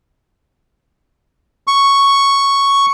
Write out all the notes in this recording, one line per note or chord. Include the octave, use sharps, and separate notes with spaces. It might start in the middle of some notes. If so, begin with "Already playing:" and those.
C#6